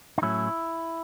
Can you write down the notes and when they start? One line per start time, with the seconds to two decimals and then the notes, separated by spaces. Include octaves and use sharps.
0.18 D#4
0.22 A2 F#3 C#4 E4